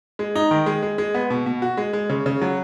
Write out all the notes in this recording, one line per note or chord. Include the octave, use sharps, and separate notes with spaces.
G#3
D#4
D#3
G#3
G#3
G#3
B3
B2
B2
F#4
G#3
G#3
C#3
C#3
F#3